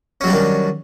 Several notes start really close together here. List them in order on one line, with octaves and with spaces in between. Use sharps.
C#4 F#3 G3 D4 D#3